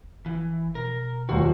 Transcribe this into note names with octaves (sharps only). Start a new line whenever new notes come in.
F#1
E3
B2 A#4
D#1 D#2 F#4